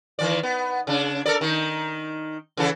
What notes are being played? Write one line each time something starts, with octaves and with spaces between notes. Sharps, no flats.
D#3 E3 D5
B3
C#3 D4
A4 A#4 D5
D#3 D#4
C#3 E3 A4